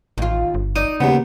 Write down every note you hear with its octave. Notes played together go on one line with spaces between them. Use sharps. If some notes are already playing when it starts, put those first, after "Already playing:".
A1 D#2 F4
G1
D#4 D5 D#6
D#2 C#3 B3